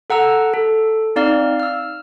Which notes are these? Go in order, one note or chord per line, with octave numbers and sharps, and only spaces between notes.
A4 F#5 A#5 E6
A4
C4 D#4 D5 F5 F6
E6 F6